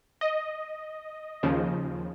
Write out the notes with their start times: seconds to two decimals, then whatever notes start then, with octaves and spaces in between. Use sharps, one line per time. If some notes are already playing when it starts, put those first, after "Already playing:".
0.21 D#5
1.43 D#2 C#3 F3